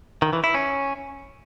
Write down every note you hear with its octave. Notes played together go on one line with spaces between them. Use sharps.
D#3
E3
E4
C#4